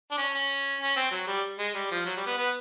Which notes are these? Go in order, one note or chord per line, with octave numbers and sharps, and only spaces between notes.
D4
C#4
C#4
C#4
C4
F#3
G3
G#3
G3
F3
F#3
G3
B3
B3